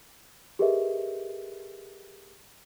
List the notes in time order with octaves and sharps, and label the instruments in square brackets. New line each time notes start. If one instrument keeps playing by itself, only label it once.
[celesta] G4 G#4 A#4 B4 D#5 E5